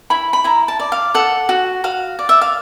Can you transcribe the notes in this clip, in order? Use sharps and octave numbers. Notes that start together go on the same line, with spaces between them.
E4 B5
B5
E4 A#5
A5
D5
F5
A4 F#5
F#4
F#4 F5
D5
E5
F5